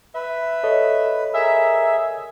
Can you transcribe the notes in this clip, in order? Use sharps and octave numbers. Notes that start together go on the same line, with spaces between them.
B4 E5
A4 C#5 D#5
G#4 A#4 E5